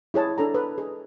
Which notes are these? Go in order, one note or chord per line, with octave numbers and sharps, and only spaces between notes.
E4 G#4 C#5 A5
D4 A4 A#5
B4
G#4